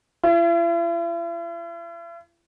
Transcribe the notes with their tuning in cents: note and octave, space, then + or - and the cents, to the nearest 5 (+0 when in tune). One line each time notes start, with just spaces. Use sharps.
E4 +45